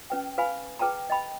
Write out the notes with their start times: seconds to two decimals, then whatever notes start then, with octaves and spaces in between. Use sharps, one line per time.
0.10 C#4 B4 G5
0.38 B4 F5 G#5 B5
0.79 G#4 B4 G5 A5 A#5
1.10 D#5 G5 B5